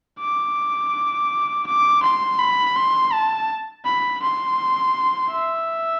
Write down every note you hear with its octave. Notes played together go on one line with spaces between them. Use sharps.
D6
D6
C6
B5
C6
A5
B5
C6
E5